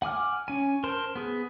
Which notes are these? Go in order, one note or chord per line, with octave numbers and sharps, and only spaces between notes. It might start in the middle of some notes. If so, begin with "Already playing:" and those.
F#5 G#5 D6 F6
C#4 G#5
A#4 C5 A5 C6
B3 G#4